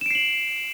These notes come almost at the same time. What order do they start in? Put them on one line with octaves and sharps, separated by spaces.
E7 D7 C7 F#7